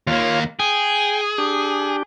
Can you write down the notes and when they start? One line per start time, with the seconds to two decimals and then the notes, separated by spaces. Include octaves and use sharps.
0.07 D#2 A#3 F4 C#5 F5
0.60 G#4 G5 G#5
1.38 D4 G4